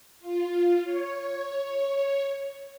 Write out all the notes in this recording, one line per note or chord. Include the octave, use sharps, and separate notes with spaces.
F4
C#5